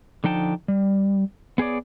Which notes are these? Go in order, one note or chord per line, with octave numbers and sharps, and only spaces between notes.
D3 F3 D#4 G5 A5
G3
B3 G#4 C#5 D5